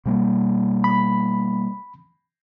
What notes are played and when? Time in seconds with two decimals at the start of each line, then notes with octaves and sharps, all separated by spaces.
0.06 B2 G3 A#3
0.84 B5